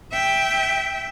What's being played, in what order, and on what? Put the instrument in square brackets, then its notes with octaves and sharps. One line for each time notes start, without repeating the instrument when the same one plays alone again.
[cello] E5 G5